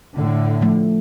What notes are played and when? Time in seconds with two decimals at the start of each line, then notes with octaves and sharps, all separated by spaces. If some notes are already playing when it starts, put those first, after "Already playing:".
0.15 A2 D3
0.61 F3 A3